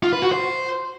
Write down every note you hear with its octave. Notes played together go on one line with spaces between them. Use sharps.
F4
B4
F#4
C5